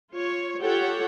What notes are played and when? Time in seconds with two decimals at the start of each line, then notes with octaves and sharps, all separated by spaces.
0.12 F4 C#5
0.62 F4 G4 A4 C#5 F#5 G5